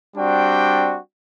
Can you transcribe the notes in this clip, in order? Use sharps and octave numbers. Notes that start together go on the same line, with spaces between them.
G3 C4 D4 F#4 D5 G5